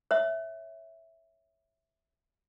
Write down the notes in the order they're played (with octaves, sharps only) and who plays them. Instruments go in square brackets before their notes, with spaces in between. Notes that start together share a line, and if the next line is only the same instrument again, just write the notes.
[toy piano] C#5 E5